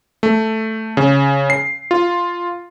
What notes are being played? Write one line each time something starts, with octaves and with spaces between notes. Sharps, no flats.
A3
C#3
C7
F4